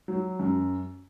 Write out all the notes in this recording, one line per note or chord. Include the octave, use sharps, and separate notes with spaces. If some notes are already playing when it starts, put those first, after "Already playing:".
F#3
F#2